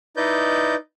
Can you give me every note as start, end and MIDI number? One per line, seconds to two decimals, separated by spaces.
0.17 0.75 63
0.17 0.75 64
0.17 0.75 71
0.17 0.75 74
0.17 0.75 75
0.17 0.75 91